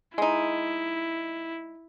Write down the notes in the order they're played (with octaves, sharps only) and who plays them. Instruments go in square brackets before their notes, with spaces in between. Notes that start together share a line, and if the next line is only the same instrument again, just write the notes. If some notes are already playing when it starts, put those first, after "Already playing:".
[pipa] G#3 D#4 [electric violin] E4